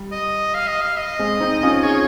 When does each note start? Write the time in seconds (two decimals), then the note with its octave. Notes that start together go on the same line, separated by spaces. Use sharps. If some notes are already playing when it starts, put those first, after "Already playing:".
Already playing: G3
0.12 D#5
0.55 F5
0.68 D#5
0.82 F5
0.99 D#5
1.19 G#3 C4
1.40 C4 D#4
1.63 C#4 F4
1.84 F4 G#4 C#5